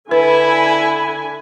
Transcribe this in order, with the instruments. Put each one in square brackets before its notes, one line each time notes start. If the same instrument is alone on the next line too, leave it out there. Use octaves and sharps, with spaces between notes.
[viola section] D3 G#5 B5 [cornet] E4 [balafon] B4